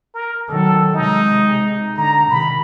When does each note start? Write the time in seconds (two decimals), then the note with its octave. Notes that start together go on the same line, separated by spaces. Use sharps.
0.14 A#4
0.49 D#3 F#3 A4
0.94 C3 G#3 D#4
1.97 D3 A#5
2.30 C3 D#3 B5